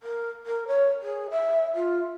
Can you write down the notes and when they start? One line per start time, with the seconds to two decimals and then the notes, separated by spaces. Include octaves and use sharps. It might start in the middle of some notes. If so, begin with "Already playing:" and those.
0.03 A#4
0.46 A#4
0.68 C#5
1.02 G#4
1.31 E5
1.75 F4